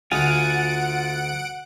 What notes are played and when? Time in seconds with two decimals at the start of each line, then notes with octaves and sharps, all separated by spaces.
0.12 D2 F4 F5 F#5 G#5 D7